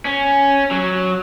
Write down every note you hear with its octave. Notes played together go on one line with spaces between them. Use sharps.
C#4
F#3